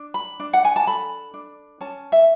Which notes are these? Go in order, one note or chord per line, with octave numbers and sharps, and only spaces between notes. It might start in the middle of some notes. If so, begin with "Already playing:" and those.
Already playing: D4
B5
D4
F#5
G#5
A5
A4 B5
D4
C#4 A5
E5